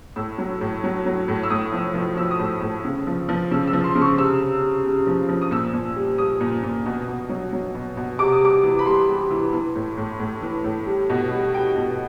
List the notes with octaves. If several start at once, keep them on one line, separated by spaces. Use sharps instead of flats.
A2 E6
F#3
A2
F#3
F#3
A2
E6
A2 D#6
F3
F3
F3 E6
D#6
A2 E6
A2
C#3
F3
F3
C#3 E6
E6
F3
C6
C#3
C#6
C3 E6
C3
C3
C3
F3
F3
D#6
A#2 E6
A#2
G3
G3 D#6
A#2
A#2
B2
B2
F#3
F#3
B2
B2
C3 D6
D#6
G3 D6
E3
B5
G3 C6
G3
E3
E3
A2
A2
A2
E3
A2
G3
B2
G3
G3 G5
B2